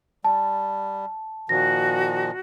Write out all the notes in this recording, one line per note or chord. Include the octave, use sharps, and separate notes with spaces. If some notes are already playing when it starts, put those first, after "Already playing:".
G3 A5
A#2 D#3 F3 F#4 A#6